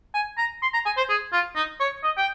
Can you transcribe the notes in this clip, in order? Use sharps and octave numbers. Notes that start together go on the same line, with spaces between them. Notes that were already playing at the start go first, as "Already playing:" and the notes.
G#5
A#5
C6
A#5
G#5
C5
G#4
F4
D#4
C#5
D#5
G5